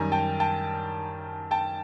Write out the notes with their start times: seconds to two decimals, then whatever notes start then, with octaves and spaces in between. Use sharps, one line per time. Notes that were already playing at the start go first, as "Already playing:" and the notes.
Already playing: F#2 D#3 G3 G#5 A#5
0.12 G5 A5
0.40 G5 A5
1.51 G5 A5